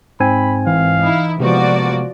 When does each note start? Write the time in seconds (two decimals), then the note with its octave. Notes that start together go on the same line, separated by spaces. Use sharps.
0.20 G#2 C4 G#5 B5
0.67 G#1 E3 F5
1.01 D#4 E4
1.40 C3 F3 G#3 A#3 B3 F#4 D5